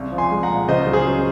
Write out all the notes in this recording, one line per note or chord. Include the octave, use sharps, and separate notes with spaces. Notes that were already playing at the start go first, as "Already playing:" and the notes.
Already playing: C2 C#3
F3
G#5 C6
G#3
F#5 A#5
A#2
C#2 C5 D#5
F#3
G#4 C5
C#4